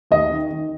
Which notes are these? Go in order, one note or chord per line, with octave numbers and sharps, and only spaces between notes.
D#2 D#5
D#3
D#3